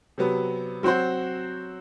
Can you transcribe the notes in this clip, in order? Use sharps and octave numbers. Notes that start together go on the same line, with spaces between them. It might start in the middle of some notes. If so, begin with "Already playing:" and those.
C3 F#3 B3
F#3 C4 F#4 C5